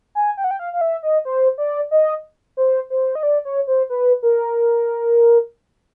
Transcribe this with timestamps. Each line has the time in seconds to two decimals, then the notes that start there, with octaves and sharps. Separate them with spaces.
0.15 G#5
0.37 G5
0.44 F#5
0.51 G5
0.59 F5
0.73 F5
0.81 E5
1.03 D#5
1.25 C5
1.58 D5
1.91 D#5
2.57 C5
2.90 C5
3.15 D#5
3.23 D5
3.45 C#5
3.67 C5
3.90 B4
4.23 A#4